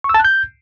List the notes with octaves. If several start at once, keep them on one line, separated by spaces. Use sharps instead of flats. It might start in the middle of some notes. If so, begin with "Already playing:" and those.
C#6
E6
A5
F#6
G6